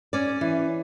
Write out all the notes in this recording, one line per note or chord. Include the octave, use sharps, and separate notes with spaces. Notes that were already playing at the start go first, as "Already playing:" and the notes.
C#4 D5
E3